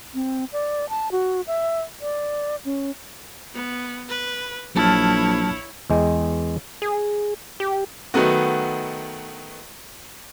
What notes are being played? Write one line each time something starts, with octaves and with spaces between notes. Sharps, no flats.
C4
D5
A5
F#4
E5
D5
C#4
B3
B4
A#1 F#3 E4 C#5 A5 F6
E2 G#3 G5
G#4
G4
D#3 F#3 A3 B3 F#4